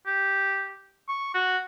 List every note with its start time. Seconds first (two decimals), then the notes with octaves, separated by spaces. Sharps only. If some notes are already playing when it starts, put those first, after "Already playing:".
0.06 G4
1.09 C#6
1.34 F#4